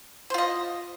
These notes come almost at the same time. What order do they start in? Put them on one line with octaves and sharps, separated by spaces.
C5 F4 D#5